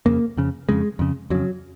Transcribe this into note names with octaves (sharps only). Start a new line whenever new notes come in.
F2 C#3 A#3
F2 C#3
F2 C#3 G#3
F2 C#3
F2 C#3 F#3